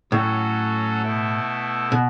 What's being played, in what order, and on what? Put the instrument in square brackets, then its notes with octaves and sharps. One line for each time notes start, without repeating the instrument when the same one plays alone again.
[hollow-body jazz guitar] A2 [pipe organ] F#3 C#4 F#4 A4
[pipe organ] B2 A3 E4
[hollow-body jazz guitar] B2